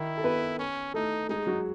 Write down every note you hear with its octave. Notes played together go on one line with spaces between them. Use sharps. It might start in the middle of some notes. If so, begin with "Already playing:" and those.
Already playing: D#3 D#4 E4
A4
B3 B4
C#4
A3 D#4 A4
G#3 D#4 G#4
F#3 F#4